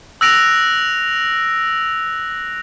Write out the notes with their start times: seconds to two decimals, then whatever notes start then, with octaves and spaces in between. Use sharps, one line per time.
0.21 E6 F#6 A#6 D7 F7